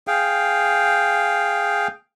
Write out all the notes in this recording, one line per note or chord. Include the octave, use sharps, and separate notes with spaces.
G#4 F5 G5